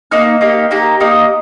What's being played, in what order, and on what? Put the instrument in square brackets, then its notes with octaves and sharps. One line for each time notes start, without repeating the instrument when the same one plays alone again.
[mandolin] A#3 D#4 F6
A#3 D#4 G4
A#3 D#4 G4
A#3 D#4 G4 D#6